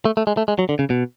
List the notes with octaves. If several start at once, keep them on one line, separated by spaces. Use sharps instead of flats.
A3
A3
G#3
A3
G#3
F#3
D3
C#3
B2